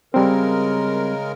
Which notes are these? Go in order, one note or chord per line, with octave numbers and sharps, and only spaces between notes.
C#3 G3 G#3 C4 A#4